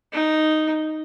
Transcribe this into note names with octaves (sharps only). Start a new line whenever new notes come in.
D#4